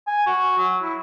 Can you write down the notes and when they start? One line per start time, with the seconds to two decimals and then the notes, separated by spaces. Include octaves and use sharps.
0.07 G#5
0.26 F#4
0.58 F#3
0.82 E4